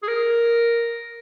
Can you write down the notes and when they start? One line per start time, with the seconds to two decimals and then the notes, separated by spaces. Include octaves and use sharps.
0.03 G#4
0.08 A#4